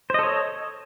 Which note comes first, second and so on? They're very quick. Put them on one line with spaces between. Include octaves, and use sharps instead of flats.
C5 D#5 A4 C#5